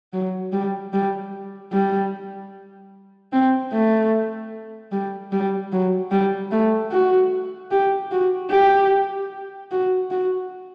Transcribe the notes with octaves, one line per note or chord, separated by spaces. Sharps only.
F#3
G3
G3
G3
C4
A3
G3
G3
F#3
G3
A3
F#4
G4
F#4
G4
F#4
F#4